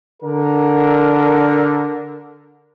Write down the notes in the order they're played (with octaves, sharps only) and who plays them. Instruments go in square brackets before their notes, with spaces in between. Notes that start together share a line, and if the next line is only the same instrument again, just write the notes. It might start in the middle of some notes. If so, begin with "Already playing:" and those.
[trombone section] D3 A#4